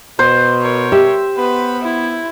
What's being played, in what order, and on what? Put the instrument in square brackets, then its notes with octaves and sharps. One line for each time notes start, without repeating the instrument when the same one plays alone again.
[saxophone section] B2 [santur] C5
[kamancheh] A#4 C#5
[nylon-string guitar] G4 [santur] E5
[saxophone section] B3 [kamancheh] B4 B5
[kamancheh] E4